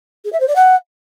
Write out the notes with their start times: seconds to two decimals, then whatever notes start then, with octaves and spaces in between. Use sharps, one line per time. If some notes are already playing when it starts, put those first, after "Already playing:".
0.25 G#4
0.33 E5
0.40 C5
0.48 D5
0.56 F#5